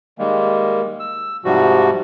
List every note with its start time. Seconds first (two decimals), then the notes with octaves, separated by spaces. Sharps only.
0.19 D#3 G3 G#3 A#3
1.00 E6
1.45 G#2 C3 F3 G3 F#4